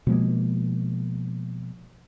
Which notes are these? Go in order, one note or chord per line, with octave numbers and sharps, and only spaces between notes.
B2 F3 G#3 A#3